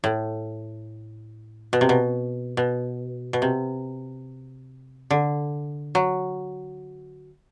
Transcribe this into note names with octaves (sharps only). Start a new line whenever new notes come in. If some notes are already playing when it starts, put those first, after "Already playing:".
A2
B2
C3
B2
B2
B2
C3
D3
F#3